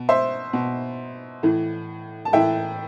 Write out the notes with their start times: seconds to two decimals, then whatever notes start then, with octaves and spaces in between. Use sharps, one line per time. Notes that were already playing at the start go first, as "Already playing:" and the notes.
Already playing: B2
0.09 C5 E5
0.53 B2
1.43 A2 E3
2.25 A5
2.33 A2 E3 E5 G5